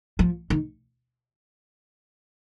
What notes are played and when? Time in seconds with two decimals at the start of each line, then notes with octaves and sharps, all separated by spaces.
0.19 F3
0.50 D#3